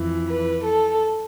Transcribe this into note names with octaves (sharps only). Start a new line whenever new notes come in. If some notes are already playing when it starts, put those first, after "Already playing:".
Already playing: F2 E3
B4
A4